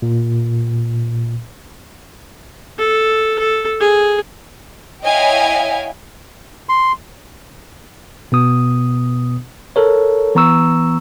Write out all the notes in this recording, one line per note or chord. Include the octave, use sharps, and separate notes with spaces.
A#2
A4
A4
G#4
E4 C#5 D#5 F5 G5 G#5
C6
B2 B3 D#6
A4 A#4 C#5
E3 B3 A#5 C#6 E6